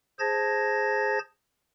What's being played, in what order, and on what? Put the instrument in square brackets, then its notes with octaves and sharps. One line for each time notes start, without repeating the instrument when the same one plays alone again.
[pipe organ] G#4 C5 A5 G#6 A#6